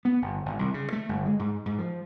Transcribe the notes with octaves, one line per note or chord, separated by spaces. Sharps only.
B3
G1
G#1
C2
C#3
A3
G1
G#3
G#2
G#2
F3